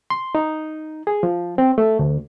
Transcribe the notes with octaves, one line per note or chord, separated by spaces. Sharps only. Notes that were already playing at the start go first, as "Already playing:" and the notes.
C6
D#4
G#4
F3
C4
A3
D2